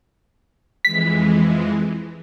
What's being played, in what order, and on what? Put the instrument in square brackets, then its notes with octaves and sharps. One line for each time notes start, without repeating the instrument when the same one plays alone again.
[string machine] F2 E3 G#3 [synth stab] B6